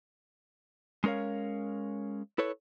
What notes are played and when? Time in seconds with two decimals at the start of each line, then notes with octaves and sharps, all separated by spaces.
1.04 G#3 C#4 A#4 C#5 F5
2.38 E4 A4 B4 C#5